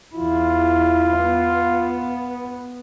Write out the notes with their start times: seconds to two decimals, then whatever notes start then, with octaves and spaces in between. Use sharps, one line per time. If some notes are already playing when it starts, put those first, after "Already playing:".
0.16 E2 E4 F4
1.18 B3